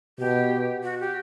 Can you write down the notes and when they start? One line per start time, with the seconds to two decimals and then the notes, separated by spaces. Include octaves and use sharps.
0.18 B2 G4
0.83 F#4
1.00 G4